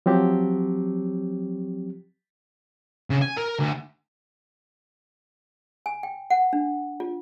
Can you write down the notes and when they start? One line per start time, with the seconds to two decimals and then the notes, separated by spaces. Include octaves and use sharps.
0.06 F3 F#3 C4 G4
3.10 C#3
3.22 G#5
3.37 A#4
3.60 D2
5.86 G#5
6.03 G5
6.30 F#5
6.53 D4
7.00 F4